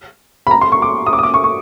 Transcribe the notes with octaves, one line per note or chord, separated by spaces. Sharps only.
B5
A#5
C6
C#6
D6
D#6
D6
D#6
D6
C#6
C#6